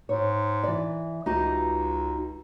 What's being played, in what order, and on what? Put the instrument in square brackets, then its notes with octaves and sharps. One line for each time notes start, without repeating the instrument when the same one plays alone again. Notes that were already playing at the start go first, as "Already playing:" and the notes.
[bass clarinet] G#2 [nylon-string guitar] C#5
[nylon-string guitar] E3 D5
[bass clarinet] C#2 [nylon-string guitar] D#4 F#4 G4